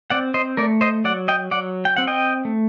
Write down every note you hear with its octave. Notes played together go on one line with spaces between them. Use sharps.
C4 D5 F#5
C5 D#5
A3 A#4 D5
C5 D#5
F#3 D5 F#5
D#5 G5
F#3 D5 F#5
G5
C4 F#5
D#5 G5
A3